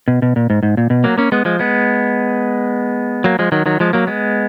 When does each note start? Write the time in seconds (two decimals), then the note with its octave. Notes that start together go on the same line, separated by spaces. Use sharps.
0.08 B2
0.22 B2
0.36 A#2
0.50 G#2
0.63 G#2
0.77 A#2
0.90 B2
1.04 F#3 A#3
1.18 A#3 C#4
1.32 G#3 B3
1.45 F3 G#3
1.59 G#3 B3
3.24 F#3 A#3
3.39 F3 G#3
3.52 D#3 F#3
3.66 D#3 F#3
3.80 F3 G#3
3.93 F#3 A#3
4.07 G#3 B3